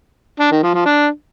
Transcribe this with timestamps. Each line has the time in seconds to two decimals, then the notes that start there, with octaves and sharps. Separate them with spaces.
0.40 D4
0.51 D#3
0.63 F3
0.74 F3
0.86 D4